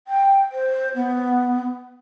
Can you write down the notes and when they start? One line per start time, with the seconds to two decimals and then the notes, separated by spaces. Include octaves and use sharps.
0.08 G5
0.52 C5
0.95 B3